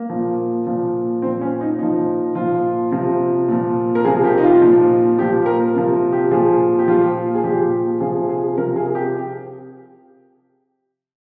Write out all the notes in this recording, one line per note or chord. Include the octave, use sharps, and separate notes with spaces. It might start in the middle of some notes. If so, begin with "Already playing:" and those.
Already playing: A#3
A#2 F3
A#2 F3
A#2 F3 C4
C#4
D#4
A#2 F3 D#4
A#2 F3 F4
C3 F3
A#2 F3
A#4
C3 F3 G#4
G4
D#4
F4
A#2 F3
A#2 F3 G4
A#4
C3 F3
G4
A#2 F3 G#4
G4
A#2 F3 F4
G#4
A#2 F3 G4
C3 F3 G#4
G#4
C3 F3 A#4
G#4
G4